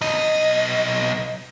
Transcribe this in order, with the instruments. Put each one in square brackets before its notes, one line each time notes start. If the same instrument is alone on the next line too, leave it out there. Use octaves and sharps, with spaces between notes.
[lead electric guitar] B1 D#5